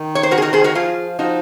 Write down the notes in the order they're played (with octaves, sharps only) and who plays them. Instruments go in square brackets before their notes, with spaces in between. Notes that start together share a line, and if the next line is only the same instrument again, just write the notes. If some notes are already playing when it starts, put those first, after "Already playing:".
Already playing: [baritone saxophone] D#3
[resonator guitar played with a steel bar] C#5
C5
F#4 A#4
G#4
F#4 A#4
G#4 C5
F#4 A#4
[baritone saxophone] F3 [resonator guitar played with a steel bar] F4 G#4
[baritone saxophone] F3 [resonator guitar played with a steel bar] D#4 F#4